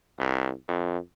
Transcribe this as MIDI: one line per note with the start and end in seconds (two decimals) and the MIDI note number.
0.19 0.51 36
0.68 0.98 41